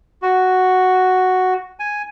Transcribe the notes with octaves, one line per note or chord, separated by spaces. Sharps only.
F#4
G#5